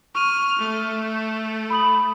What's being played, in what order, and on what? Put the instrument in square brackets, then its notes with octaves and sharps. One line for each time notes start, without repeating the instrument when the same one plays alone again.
[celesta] C#6 D#7 [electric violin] F6
[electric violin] A3
[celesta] B5 D#6 F#7